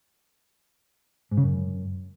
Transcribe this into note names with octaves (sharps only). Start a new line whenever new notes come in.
G#2
C#3
F#2